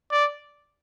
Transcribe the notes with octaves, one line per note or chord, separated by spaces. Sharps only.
D5